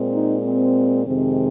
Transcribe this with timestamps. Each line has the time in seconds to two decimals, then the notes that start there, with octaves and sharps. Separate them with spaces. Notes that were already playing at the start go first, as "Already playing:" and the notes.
Already playing: A#2 G#3 C4
0.13 D#4
0.44 C4
1.06 F2 C3 D#3 G#3 C4